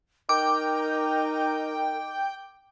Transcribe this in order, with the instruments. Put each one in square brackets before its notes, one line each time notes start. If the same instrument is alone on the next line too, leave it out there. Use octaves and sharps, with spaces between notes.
[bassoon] D#4 [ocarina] A#4 [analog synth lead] G5 [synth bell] D6